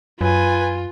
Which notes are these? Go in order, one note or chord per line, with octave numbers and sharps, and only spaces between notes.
F#2 F4 B4 G#5